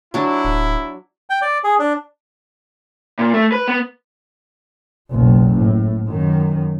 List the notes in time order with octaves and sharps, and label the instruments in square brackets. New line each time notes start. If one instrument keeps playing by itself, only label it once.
[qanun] F#3 D4 [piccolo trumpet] E4
[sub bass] D1
[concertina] G5
D5
G#4
D4
[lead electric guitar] A#2
A3
B4
B3
[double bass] F#1 B1
A2
F#2 D#3